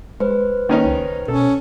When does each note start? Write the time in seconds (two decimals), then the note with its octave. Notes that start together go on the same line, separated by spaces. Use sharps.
0.20 G#3 B4 C5
0.69 D#3 A#3 C#4 D#4
0.86 C#2
1.28 B2 C#4 A4